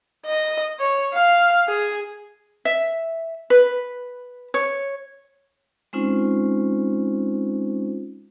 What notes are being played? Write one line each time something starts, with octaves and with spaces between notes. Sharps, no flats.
D#5
C#5
F5
G#4
E5
B4
C#5
G#3 C4 C#4 D#4 F4 C5